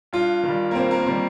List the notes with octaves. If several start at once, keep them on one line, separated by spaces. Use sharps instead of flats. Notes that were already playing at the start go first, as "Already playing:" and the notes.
G2 F4
D#3 G3
A#3
G2 C4
A#3
D#3 G3 C4